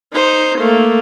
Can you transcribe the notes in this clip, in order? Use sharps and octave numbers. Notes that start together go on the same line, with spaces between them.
D#4 C5
A3 A#3